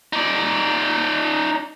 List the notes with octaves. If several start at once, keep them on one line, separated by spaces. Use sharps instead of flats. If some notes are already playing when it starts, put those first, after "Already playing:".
D#4 D5